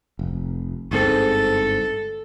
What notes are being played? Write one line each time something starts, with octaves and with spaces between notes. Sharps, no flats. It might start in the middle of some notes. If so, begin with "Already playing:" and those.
F1
G1 G#2 C4 A4